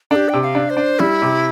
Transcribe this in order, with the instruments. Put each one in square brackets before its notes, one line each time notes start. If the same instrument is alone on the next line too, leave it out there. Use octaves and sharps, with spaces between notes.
[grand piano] D4 [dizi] A4
[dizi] G4
[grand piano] C3 [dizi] G5
[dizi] G5
F5
[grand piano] D4
[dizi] C5
[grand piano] D4
[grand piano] G3 [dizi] E4
[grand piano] C3